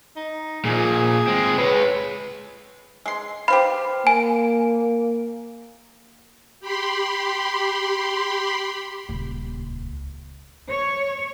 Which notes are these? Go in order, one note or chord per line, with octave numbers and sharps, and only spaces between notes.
D#4
A#2 F3 G#4
G#3 C4
G#3 B4 C#5
G#3 C6
G4 C5 F5 B5
A#3 G#5
G4 B5 C6
D#1 C#2
C#5